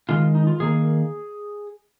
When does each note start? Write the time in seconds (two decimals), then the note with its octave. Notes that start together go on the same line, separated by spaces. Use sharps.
0.09 D#3 G#3 F4
0.35 D#4
0.47 F4
0.60 D#3 A#3 G#4